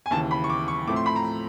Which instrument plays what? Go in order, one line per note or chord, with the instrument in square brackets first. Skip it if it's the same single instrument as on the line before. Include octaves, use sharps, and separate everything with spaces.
[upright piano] G#5
D#2 C#3 E3 A5
B5
C#6
D6
C#6
A2 F3 A3 C4 D6
C6
B5
A#5